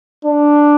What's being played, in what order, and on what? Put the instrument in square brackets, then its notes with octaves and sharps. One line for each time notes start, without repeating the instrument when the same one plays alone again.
[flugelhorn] D4